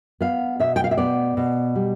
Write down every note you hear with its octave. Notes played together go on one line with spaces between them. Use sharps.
B3 F5
B2 E5
G5
F5
E5
B3 D5
B2
G3